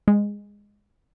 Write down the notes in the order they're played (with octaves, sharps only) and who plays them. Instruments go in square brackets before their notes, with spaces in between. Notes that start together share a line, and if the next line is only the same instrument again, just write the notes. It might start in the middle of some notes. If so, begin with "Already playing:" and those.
[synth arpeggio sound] G#3